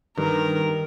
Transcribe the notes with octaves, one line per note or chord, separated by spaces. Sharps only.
G2 D#3 A#4